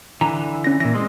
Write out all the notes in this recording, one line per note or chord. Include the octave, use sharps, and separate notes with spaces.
D3 E3 A#5
C#4 A#6
A#2 E3 A#6
G#3 C4